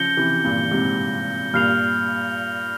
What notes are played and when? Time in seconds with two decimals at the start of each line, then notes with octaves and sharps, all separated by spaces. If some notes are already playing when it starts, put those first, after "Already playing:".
Already playing: C#3 F3 G6 A#6 C#7 G7
0.17 C3 E3
0.45 G2 A#2
0.71 G#2 C3
1.54 G2 A#2 F6 C7 F7